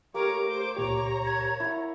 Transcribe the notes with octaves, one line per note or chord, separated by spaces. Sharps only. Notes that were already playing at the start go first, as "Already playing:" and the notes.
A3 A#3 G4 A#4 C#5 D6
C5
C#2 A#2 G4 C#5 A#5
G#6
E4 F#5